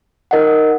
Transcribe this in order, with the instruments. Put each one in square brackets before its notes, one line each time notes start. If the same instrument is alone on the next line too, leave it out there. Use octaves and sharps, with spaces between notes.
[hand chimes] D#4 A#4 D#5 F#5